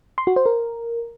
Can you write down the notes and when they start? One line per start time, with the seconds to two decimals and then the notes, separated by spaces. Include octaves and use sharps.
0.18 C6
0.27 F#4
0.36 C5
0.46 A#4